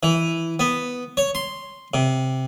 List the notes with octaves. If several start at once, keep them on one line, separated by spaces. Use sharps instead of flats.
E3
B3
C#5
C6
C3